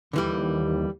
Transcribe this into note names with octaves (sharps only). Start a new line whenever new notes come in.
D#2 D3 E3 G3